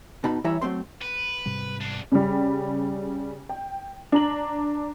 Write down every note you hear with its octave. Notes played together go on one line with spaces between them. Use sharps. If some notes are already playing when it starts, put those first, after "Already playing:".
B2 D#4 A5 B5
E3 G3 E4 C#5 E5 A#5
F#3 A3 C4 C6
B4
G#2 C3 G3
E2 D4
C#3 G3
G5
D4 A#5 F#7